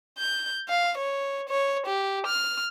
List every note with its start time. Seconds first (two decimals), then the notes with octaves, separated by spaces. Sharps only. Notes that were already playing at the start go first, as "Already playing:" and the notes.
0.18 G6
0.69 F5
0.98 C#5
1.49 C#5
1.86 G4
2.27 F6